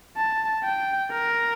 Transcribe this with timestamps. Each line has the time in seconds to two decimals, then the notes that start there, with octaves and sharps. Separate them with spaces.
0.17 A5
0.64 G5
1.11 A#4